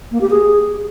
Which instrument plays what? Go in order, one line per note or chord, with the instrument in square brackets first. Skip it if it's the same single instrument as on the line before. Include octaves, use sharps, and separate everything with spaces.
[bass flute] A#3
G4
G#4